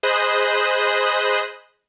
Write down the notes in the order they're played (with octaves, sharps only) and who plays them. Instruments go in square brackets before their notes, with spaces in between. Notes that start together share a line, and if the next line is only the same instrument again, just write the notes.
[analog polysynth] G#4 C5 D#5 B5 D#6 F#6